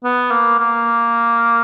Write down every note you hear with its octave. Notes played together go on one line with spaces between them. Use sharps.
B3
A#3
A#3